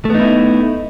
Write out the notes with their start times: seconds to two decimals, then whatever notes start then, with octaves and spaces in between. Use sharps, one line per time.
0.05 A3
0.10 B3
0.15 D#4
0.20 E4